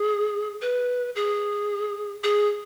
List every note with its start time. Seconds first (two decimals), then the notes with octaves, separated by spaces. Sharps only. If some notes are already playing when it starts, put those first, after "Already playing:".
Already playing: G#4
0.62 B4
1.16 G#4
2.24 G#4